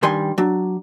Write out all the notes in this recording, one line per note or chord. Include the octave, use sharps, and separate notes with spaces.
G2 D#3 G3 G#5 C6
F#3 D4